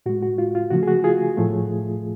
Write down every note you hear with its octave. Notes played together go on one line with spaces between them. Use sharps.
A2 G#3 F#4
F#4
F4
F4
C#3 F3 A3 F#4
G#4
F#4
F4 G#4
A2 F3 A3